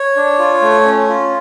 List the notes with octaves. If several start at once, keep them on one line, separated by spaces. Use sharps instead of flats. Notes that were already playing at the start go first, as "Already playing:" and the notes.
Already playing: C#5
D4
F4
A3
C#4
F4